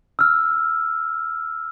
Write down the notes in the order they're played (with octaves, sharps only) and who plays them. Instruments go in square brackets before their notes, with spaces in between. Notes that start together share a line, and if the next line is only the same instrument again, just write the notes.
[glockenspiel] E6 F6